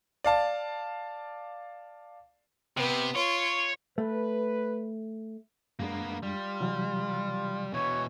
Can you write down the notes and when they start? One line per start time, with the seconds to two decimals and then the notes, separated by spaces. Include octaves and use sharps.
0.24 D5 F5 A5
2.77 C3 B3
3.15 F4 C#5
3.98 A3 B4
5.80 F#2 G#3 A#3 B3 D4
6.23 G3 F4
6.60 C3 E3 F#3
7.74 B2 E3 C#5